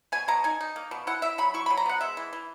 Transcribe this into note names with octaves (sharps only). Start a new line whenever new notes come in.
B2 G#5
B2 A#5
D#4 G#5
D#4
A#3
B2
E4 F#5
E4 E5
F#3 B5
E4 C#6
B5
F#3
A#5
B3 F#5
G#3 E5
E3
E3